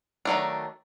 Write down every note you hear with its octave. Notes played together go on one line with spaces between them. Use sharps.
D#3 F#3 A3 D4